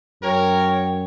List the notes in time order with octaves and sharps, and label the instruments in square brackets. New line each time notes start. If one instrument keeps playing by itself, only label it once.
[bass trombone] F#2 [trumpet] A#4 [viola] C#5 [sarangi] G5